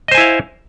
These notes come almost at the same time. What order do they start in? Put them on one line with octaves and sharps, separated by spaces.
D#5 C5 G#5 E4 F5